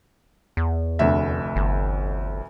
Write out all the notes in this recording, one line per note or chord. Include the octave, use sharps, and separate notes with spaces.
E2
F1 D2 E5
G1